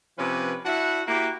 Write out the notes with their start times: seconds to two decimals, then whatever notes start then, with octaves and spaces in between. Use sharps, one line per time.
0.18 C3 F3 C#4 B4
0.65 D4 E4 F#4 E5 F#5
1.07 A#3 E4 F#4 G4